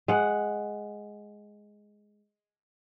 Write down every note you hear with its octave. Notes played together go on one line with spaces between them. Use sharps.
G#3 F#5